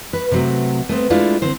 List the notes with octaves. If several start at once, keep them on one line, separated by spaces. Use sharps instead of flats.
B4
C3 F#3 A3
A3 B3 C4
G#3 A3 D4 E4 F4
D3 C4 C5